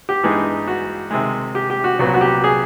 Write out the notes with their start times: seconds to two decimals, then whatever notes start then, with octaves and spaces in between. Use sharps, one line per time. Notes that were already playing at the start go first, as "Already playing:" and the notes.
0.09 G4
0.23 G2 E3 G#3 B3 D#4
0.67 F#4
1.11 C3 D#3 G#3
1.55 G4
1.70 G4
1.84 F#4
1.99 C2 A#2 F#3 B3 F#4
2.14 F#4
2.21 G4
2.44 G#4